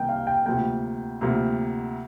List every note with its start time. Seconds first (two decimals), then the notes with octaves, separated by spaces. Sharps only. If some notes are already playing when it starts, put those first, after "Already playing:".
Already playing: C2 C3 D#3 A#3 D#4 G5
0.09 F5
0.27 G5
0.46 D2 C3 F3 A#3 G5
1.21 D2 C3 F3 A#3